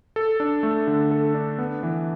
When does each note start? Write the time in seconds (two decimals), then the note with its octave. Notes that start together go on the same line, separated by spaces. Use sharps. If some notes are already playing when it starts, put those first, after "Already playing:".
0.16 A4
0.40 D4
0.63 A3
0.87 D3
1.11 A4
1.34 D4
1.59 B3
1.83 E3